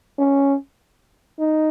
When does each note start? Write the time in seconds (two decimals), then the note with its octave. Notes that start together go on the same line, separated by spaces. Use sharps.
0.18 C#4
1.39 D#4